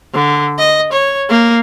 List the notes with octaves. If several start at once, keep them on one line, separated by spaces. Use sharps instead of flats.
D3
D#5
C#5
A#3